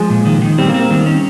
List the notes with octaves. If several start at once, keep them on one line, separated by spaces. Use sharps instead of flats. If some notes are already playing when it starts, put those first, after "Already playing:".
Already playing: F3 G#3
A#2
D#3
D#3
G3 C4
A#3
C4
A#3
D#3 G3
C#4